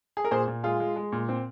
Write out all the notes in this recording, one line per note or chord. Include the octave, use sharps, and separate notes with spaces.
G#4
A#4
A#2 G#4 C5
A#2
G#3 F4 G#4
G#3
G#3
A#2
C4